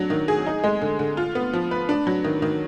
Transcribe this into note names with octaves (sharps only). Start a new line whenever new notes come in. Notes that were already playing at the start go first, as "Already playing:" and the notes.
Already playing: F#3 D4
D#3
G#4
D#4
G#3
D3
D3
F4
B3
F3
B4
D4
F#3
D#3
D#3